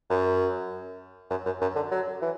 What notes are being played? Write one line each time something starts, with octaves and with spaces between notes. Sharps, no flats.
F#2
F#2
F#2
F#2
D3
F#3
E3